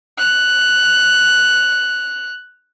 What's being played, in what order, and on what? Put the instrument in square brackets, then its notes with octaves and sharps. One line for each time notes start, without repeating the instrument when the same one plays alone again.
[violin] F#6 F7